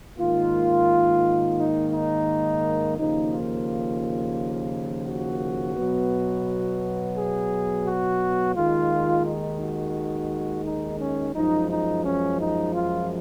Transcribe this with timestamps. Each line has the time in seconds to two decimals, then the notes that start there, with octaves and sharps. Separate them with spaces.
0.19 G#2 D#3 A#3 F4
1.58 D#4
1.93 D#4
2.97 D#2 C#3 F3 A#3 D#4
3.33 F4
5.07 F#4
5.77 B2 F#3 B3
7.16 G#4
7.87 F#4
8.56 D#2 D#3 G#3 F4
9.26 D#4
9.60 F#4
10.66 D#4
11.00 C#4
11.35 F#2 F3 G#3 D#4
11.70 D#4
12.06 C#4
12.40 D#4
12.75 F4